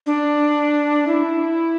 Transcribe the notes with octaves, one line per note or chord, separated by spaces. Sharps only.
D4
E4